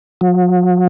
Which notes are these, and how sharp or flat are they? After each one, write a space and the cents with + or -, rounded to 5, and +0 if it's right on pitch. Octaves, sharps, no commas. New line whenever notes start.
F#3 -45